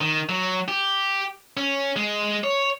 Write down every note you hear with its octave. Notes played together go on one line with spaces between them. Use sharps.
D#3
F#3
G4
C#4
G#3
C#5